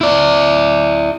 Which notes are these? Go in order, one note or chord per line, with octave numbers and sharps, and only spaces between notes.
E4 D5